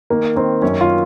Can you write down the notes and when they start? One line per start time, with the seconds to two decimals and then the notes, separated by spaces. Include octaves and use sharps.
0.10 D#3 A#3
0.36 D#3 C4
0.62 F#2 C#4
0.81 F4